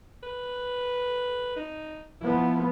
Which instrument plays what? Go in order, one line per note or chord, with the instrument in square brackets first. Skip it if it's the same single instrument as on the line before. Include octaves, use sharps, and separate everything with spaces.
[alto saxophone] B4
D#4
[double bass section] F3 B3 [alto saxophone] E4